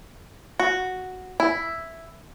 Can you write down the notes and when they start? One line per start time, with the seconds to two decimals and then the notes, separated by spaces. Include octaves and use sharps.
0.60 F#4
1.40 E4